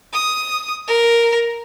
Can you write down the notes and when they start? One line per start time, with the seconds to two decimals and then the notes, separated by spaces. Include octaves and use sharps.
0.13 D#6
0.88 A#4